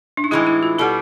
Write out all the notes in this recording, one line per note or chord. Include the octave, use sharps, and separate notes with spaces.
D4
D#4
A2 E3 G#3 E4
E4
F4
B2 G3 B3 A4